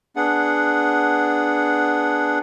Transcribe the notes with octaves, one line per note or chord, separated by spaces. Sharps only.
B3 D4 G#4 F#5